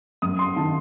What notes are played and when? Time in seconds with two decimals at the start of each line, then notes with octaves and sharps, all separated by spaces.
0.22 F#2 D#6
0.39 C6
0.56 D#3 A5